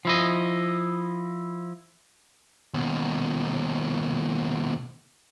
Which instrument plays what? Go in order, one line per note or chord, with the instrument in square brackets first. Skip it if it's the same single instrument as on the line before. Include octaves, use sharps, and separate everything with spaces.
[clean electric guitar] F3 E4 D#5
[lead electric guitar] D#2 B2